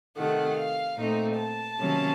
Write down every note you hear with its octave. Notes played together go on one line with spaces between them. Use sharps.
C3 D#3 A3 F#5
F5
A#2 A3 C4 D#4
A5
C3 D#3 F#3 A#3 C#4